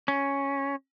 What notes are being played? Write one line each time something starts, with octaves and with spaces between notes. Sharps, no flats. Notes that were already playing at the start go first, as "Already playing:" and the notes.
C#4